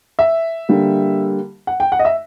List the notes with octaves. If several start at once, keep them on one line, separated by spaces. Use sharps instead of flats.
E5
D3 G3 A#3
F#5
G5
F#5
D#5
E5